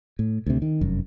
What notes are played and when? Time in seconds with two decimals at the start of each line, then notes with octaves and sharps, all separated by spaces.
0.19 A2
0.46 D2 C3
0.62 D#3
0.81 F1 F#2